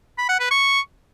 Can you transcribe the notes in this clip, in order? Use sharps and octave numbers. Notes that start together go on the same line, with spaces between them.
B5
F#5
B4
C#6